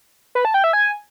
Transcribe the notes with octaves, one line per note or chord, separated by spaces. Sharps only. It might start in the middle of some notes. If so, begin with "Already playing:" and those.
B4
A5
G5
E5
G#5